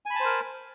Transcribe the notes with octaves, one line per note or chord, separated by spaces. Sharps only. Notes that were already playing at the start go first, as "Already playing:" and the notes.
A#4 C5 G#5 A5 B5